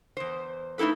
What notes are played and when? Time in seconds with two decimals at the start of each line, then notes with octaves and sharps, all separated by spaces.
0.17 E2 C5
0.78 A3 D#4 E4 A4 B4